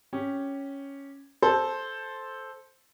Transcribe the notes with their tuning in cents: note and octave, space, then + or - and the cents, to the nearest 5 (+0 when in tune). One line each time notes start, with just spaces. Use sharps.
C#4 +0 G4 +0
A4 -10 C5 +5